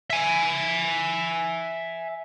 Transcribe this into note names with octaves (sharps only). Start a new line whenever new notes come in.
E5 G#5